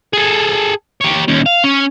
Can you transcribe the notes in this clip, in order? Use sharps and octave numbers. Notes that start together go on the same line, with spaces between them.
G#4 A4
G4 C#5
D#2 C#4
F5
C#4